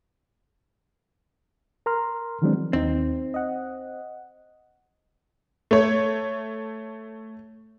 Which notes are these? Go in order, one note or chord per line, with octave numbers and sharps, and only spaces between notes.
A#4 A#5 C6 F6
D#3 E3 F#3 G#3 C4 D4
D#2 C4 D#4
D#5 F#5
A3 C#5